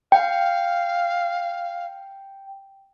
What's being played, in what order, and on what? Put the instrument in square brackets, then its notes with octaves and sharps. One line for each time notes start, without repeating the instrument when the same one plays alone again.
[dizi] F5 [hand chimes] G5